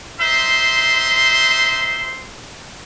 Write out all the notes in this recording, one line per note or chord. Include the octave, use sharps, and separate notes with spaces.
D#4 C5 E5 C6